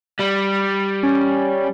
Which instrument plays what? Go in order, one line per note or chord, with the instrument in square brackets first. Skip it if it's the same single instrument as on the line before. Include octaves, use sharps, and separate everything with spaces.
[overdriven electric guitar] G3
[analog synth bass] C#4